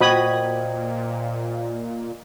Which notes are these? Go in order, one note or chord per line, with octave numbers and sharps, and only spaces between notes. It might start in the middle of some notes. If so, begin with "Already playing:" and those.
A#2 F#4 C5 D#5 G5 B5 D#6 G#6